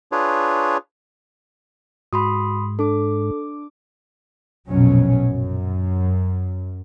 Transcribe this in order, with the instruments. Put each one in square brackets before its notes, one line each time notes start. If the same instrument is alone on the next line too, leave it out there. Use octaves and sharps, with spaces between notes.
[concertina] D4 F4 G#4 B4 C#5
[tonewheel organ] G#2 [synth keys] F#4 [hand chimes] B5 C6 D#6
[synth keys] D4 D6 [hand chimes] A4
[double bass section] A#1 F2 B2 F#3 C#4
F#2